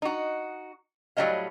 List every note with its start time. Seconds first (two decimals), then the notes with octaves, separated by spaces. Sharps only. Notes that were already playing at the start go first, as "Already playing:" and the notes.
0.02 D#4 F#4
1.17 A2 F#3 G3 A#3 D#5 F5